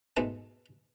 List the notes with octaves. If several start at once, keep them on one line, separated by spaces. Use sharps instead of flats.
G#2 B2 A3 B4 C6